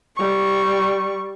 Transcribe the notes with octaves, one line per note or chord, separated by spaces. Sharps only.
G3 C#6